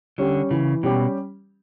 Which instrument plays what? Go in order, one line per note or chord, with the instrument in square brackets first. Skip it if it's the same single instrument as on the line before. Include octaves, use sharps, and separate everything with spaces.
[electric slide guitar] D3 [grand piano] G3 C#4 G4
[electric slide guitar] C#3 [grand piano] E3
[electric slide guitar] B2 [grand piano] G3 C#4 G4